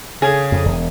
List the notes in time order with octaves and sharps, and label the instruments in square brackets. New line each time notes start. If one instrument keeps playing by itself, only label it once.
[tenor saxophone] C#3 [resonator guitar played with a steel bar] G#4
[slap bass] F2
E1